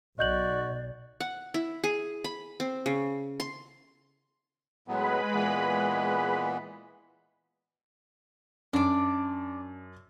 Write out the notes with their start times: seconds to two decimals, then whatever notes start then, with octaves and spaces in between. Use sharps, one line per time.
0.19 B1 F#4 D5 D#5 G6 F#7
1.20 F#5
1.54 E4
1.84 G#4
2.24 B5
2.60 C4
2.86 C#3
3.40 C6
4.88 A2 F#3 G#3 B3 B4 B5
5.33 A#2 E3 B3
8.73 F#2 D4 D6